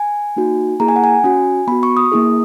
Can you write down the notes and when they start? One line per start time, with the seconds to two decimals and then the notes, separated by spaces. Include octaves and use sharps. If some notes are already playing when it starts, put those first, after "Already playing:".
Already playing: G#5
0.36 A#3 D#4 F#4
0.80 A#3 E4 G#4 A#5
0.88 G#5
0.96 F#5
1.04 G#5
1.24 C#4 F#4
1.67 B3 F#4 B5
1.83 C#6
1.97 D#6
2.12 A#3 E4 G#4